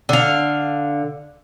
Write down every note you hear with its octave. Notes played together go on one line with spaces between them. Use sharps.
D3 F5